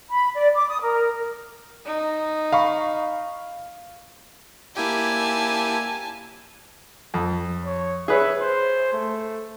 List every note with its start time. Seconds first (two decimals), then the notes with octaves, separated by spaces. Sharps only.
0.11 B5
0.36 D5
0.55 D6
0.70 D#6
0.83 A#4
1.86 D#4
2.53 F5 B5 C#6
4.77 A#3 E4 G4 G#5 A5
7.14 F2
7.65 C#5
8.08 G#4 B4 C#5 E5
8.41 C5
8.93 A3